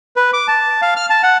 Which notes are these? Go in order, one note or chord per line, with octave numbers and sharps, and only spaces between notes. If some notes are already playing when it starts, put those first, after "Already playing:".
B4
D6
A5
F5
F6
A5
F#5